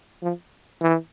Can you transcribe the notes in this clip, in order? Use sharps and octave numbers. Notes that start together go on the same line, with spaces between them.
F3
E3